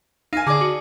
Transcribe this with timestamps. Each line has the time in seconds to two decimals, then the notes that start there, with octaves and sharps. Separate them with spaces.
0.33 D#4 F5 G#5
0.47 D3 G#4 D5 D6
0.61 F#4